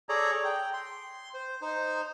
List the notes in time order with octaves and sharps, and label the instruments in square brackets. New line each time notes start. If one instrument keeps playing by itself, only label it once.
[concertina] G#4 A4 C#5 D5 A#5
G5
C6
C5
D#4 C5